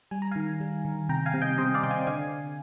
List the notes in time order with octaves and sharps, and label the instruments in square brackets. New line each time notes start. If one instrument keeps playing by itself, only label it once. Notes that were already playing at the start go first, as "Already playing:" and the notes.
[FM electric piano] G3 G#5
A#5
D#3 F5 G#5
G3
D#3
C3 G5 A#5
F5 G#5
C3
D#5 G5
C3 C5 D#5
D5 F5
C3 G5
F5 G#5
D3 F5 G#5